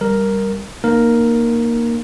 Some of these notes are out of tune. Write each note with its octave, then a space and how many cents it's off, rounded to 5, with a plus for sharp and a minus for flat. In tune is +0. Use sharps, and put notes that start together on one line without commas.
G3 +0 A#4 +0
A#3 +5 D#4 -30 A#4 +0